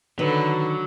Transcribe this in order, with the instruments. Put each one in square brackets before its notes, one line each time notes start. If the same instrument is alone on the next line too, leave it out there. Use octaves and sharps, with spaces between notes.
[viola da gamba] D3 [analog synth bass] D#3 [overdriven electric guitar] F#3 [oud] B4